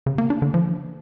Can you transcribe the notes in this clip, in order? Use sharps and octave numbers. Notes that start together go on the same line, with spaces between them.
C#3
A#3
D4
D3
F3